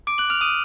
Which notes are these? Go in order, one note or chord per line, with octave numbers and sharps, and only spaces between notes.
D6 D7
F#6 F#7
F6 F7
D#6 D#7